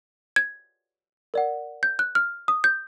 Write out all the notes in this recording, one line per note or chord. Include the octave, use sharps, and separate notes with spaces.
G#6
A#4 D5 F#5
G6
F#6
F6
D#6
G6